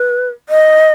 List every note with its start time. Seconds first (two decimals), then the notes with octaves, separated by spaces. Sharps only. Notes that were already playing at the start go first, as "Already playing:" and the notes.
Already playing: B4
0.49 D#5